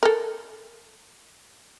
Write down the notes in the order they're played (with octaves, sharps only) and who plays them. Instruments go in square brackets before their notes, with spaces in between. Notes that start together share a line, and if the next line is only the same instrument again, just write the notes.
[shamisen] A4 A#4